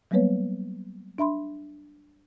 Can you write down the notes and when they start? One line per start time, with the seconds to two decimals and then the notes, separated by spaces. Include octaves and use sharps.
0.11 F#3 G3 A#3 B3 B4 C#5
1.18 D4 E5 B5 C6